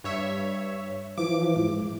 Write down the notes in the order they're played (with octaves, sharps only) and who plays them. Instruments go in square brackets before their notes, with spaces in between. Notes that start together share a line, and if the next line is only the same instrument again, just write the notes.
[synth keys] G2 C#5 E5
[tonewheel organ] E3 F3 [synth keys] D6
[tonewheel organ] G#2